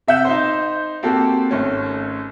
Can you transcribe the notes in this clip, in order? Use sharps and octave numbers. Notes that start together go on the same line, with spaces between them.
C3 E5 F#5 G6 E7
D#4 C5
A#3 C4 F#4 G4 A4
G#1 A3 C#4